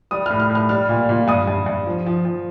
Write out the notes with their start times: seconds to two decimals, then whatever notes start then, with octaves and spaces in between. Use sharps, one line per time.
0.11 G3 D#6
0.26 A2 F6
0.40 F6
0.50 A2
0.55 F6
0.69 G3 F6
0.89 A#2
1.09 A#2
1.28 G2 D#6
1.47 G2
1.66 G2
1.86 F3
2.06 F3
2.25 F3